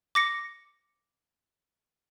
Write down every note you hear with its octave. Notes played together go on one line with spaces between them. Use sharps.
D6 A#6 C#7